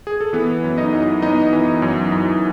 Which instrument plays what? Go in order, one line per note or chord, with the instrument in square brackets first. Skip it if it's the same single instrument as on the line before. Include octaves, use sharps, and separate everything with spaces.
[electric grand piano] G#4
A4
E3 B3 B4
F#2
D#4 D#5
F#2
B3 D#4 D#5
E3
F#2
F#2